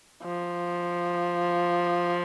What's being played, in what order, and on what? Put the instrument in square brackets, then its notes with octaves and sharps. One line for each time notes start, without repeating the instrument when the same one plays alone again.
[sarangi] F3